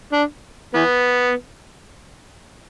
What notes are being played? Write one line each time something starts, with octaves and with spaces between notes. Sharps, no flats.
D4
E3 B3